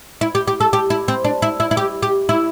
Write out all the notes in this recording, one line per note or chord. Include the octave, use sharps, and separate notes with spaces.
E4
G4
G4
A4
G4
E4
C4
D4
E4
E4
E4
G4
G4
E4